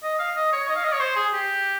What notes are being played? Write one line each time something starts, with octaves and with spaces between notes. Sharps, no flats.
D#5
F5
D#5
C#5
D#5
F5
D#5
C#5
C5
G#4
G4